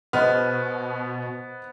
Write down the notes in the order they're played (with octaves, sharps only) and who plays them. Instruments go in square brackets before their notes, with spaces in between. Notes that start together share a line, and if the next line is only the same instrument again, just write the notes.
[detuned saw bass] B2 [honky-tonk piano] B3 [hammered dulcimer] B4 C5 [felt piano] D#5 F6